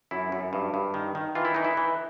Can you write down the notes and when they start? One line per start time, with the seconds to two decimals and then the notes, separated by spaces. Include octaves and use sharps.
0.11 F#2 E4
0.32 F#2
0.53 G2
0.74 G2
0.94 D#3
1.15 D#3
1.35 E3 F4
1.45 E4
1.55 E3 D#4
1.64 E4
1.77 E3